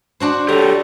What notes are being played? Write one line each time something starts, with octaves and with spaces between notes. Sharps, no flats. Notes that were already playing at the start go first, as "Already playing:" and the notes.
D4 F#4 C5
G4 A4 C#5 D5 A#5